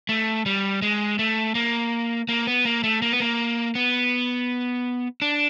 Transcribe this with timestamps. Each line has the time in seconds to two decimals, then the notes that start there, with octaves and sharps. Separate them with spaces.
0.09 A3
0.46 G3
0.82 G#3
1.19 A3
1.55 A#3
2.29 A#3
2.47 B3
2.65 A#3
2.84 A3
3.02 A#3
3.12 B3
3.20 A#3
3.75 B3
5.22 D4